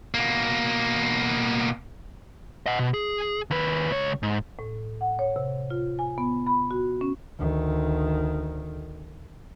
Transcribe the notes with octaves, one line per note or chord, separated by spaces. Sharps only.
B2 A#3
D#5 F#5
B2
G#4
D#2 B4
C#2 C#5
G#2
A2
F#5
C#5
C3
F4
G#5
B3
B5
F#4
C#4
D2 D#3